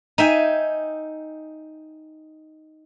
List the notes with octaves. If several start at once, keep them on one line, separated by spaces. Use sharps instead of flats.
D#4 E5 G5 G#5